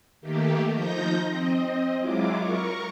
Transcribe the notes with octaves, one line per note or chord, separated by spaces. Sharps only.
D#3 A3 A#3 G4
F3 D#4 G6 A#6
C4 D#5
F#3 G#3 E4 F4 D6
A#4 C#6